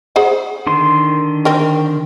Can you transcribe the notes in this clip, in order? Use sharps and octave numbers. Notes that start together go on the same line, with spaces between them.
G#4 C5 F#5
D3 D#3 C6
C4 A#4